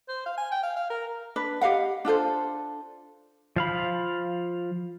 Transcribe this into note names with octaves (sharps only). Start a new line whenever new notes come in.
C5
F5
G#5
G5
F5
F5
A#4
D4 B4
G4 D#5 F5 F#5
D4 F4 A4 C5
F3 F5 B5